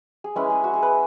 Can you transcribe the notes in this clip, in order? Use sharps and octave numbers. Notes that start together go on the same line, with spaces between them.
G#4
G#3 C#4 E4 B4
G#4
F#4
G#4
B4